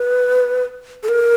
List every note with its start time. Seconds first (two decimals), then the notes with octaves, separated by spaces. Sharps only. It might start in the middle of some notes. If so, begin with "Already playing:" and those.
Already playing: B4
1.03 A4
1.09 A#4